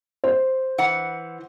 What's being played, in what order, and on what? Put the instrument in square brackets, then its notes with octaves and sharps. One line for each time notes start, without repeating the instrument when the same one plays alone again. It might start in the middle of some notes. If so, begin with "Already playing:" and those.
[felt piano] C5
[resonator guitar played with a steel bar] E3 F#5